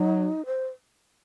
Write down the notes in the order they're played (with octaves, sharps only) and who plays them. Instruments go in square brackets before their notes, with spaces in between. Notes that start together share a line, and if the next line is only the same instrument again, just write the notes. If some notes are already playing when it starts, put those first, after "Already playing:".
Already playing: [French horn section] F#3 [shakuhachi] D#4
[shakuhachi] C5